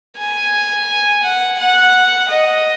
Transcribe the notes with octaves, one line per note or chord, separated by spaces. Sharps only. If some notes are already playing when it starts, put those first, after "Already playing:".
G#5
F#5
F#5
D#5